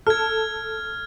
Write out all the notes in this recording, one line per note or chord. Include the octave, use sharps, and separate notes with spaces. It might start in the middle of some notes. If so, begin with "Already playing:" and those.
A4 F6 G#6